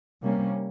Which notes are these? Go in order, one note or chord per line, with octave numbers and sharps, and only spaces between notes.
C3 G3 A#3 C#4